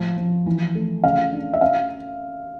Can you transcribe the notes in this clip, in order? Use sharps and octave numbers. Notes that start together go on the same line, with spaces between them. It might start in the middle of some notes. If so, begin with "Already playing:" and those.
Already playing: A2 F3
F3
E3
A3
C#3 F5
D4
E5
C#4 F5